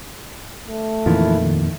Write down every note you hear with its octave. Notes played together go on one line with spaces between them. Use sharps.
A3
F2 A#2 D#3 E3 E4 F4
D#2